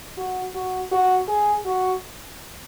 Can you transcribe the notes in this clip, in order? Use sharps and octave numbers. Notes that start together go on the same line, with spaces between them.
F#4
F#4
F#4
G#4
F#4